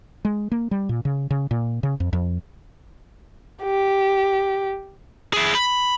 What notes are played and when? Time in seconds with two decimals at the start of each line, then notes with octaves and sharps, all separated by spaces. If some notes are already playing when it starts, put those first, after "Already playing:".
0.25 G#3
0.52 A#3
0.71 G3
0.89 A#2
1.05 C#3
1.30 C#3
1.51 A#2
1.83 C#3
2.00 F2
2.13 F2
3.63 G4
5.33 E4 G#4
5.55 B5